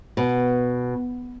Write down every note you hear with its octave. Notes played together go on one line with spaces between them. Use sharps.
B2